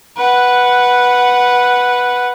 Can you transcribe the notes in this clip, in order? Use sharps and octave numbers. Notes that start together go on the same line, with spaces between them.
B4 F#5